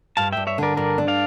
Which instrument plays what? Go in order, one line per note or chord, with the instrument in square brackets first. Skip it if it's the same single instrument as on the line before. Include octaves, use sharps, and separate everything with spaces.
[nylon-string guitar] G2 [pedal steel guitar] F5 A5
[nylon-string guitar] G2 [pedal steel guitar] E5 G5
[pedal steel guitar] C#5 E5
[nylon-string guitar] D3 [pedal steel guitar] A#4 D5
[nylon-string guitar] G2 [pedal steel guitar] A#4 D5
[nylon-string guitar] D4
[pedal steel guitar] D5 F5